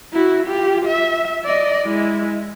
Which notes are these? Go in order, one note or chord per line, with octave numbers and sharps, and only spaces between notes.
E4 F#4
F4 G4
E5
D5 D#5
G#3 E4